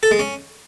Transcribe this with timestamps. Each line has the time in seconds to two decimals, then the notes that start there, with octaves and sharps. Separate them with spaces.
0.03 A4
0.11 G#3
0.19 C#4